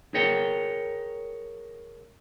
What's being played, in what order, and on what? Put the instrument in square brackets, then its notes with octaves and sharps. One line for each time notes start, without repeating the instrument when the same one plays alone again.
[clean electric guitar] G#4 A#4 C#5 G5